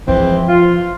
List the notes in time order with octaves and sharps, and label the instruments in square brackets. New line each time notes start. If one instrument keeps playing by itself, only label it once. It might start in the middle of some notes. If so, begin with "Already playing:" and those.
[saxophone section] E3 G#3 C4 [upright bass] F3
[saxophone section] F4